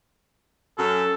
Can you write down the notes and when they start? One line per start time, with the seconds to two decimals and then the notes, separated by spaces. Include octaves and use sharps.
0.78 F#2 A4